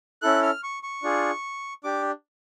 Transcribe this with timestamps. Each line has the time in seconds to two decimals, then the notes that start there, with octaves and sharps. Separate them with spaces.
0.22 C#4 E4 A4 F#6
0.43 F6
0.63 C#6
0.83 C#6
1.03 D4 F4 G#4
1.84 D4 G4 D6